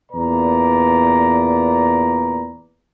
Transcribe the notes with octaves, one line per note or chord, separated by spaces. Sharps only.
E2 A#2 B4 D5 A#5